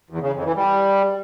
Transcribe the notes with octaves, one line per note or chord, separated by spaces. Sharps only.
E2
C#3
F2
E3
G3